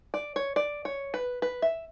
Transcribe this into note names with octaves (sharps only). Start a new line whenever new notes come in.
D5
C#5
D5
C#5
B4
B4
E5